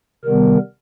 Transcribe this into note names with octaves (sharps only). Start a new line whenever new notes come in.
C3 D#3 G3 B3 A#4